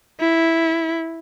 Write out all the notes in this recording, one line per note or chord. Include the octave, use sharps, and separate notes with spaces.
E4